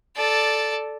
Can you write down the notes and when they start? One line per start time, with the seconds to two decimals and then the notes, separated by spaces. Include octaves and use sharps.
0.17 A4 D5